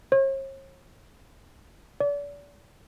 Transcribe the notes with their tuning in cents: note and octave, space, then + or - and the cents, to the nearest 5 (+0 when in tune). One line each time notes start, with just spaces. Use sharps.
C#5 -45
D5 -35